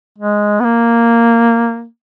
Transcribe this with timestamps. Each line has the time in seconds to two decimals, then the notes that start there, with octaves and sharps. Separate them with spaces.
0.18 G#3
0.60 B3
0.65 A#3